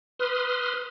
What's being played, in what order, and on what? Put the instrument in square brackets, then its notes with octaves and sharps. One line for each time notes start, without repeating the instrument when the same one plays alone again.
[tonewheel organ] B4 C6 D#6 F6